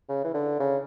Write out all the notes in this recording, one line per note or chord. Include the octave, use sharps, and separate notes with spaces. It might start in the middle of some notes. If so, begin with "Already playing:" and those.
C#3
E3
D3
C#3